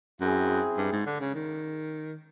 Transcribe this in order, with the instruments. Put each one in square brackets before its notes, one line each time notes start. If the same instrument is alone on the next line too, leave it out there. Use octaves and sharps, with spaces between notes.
[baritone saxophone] F#2 [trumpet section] C4 E4 G#4
[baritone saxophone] G2
G#2
D3
C#3
D#3